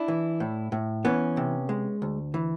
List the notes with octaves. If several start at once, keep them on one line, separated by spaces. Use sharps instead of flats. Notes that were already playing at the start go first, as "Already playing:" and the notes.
Already playing: D4 E4
E3
A2
A2
E3 B3 C#4
C3
G#3
D2
E3